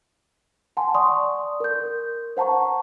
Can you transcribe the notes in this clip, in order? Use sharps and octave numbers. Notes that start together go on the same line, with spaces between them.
F#5 G#5 A5 C6
D5 F#5 C6 C#6 D#6
A#4 G6
C5 F#5 A5 A#5 C#6